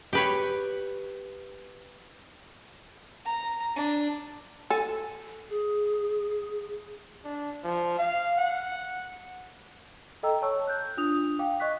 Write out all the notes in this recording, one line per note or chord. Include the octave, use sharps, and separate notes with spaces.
G4 B4 C#5
A#5
D4
A4 G#5
G#4
D4
F3
F5
F#5
A4 D#5 G5 A#5 E6
C#5 A5 C#6 E6
F#6 G6
D4 F4 D#6 F7
F5 G5 D6
D#5 C#6 F#6 B6